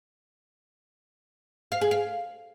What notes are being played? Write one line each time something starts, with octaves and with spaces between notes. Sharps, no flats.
F5
G#4
F5